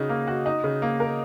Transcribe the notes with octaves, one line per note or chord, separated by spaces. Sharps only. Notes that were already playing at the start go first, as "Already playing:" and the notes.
Already playing: C#3 D#4 F#4
A#3
F#4
D#4
C#3
A#3
A#4